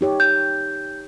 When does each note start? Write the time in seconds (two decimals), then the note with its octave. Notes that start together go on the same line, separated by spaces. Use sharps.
0.01 D#4 G4 C#5
0.20 G6